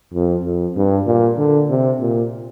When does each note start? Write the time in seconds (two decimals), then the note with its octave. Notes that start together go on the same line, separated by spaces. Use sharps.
0.14 F2
0.45 F2
0.76 G2
1.07 A#2
1.38 D3
1.70 C3
2.00 A#2